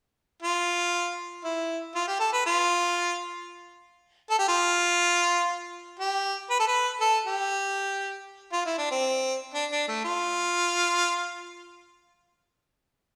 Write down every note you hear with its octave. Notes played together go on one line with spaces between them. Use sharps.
F4
E4
F4
G4
A4
B4
F4
A4
G4
F4
G4
B4
A4
B4
A4
G4
F4
E4
D4
C4
D4
D4
A3
F4